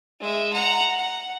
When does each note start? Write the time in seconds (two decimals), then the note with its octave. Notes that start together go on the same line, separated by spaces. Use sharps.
0.21 G#3 E5
0.53 F#5 A#5
0.97 F#5